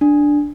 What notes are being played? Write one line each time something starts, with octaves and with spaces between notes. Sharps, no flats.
D4